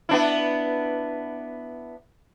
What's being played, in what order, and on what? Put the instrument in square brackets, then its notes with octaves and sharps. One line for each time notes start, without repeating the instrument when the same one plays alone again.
[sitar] B3 D4 E4